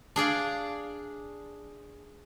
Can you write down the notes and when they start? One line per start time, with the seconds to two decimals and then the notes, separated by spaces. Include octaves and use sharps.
0.16 D4 G#4 D5 F5